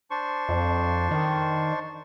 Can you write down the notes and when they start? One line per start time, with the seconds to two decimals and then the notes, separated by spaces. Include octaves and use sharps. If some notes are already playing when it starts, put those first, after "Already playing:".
0.10 D4 C5 C#6
0.49 F2
1.11 D#3